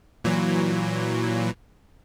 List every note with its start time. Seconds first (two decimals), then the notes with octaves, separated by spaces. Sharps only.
0.24 A#2 E3 F#3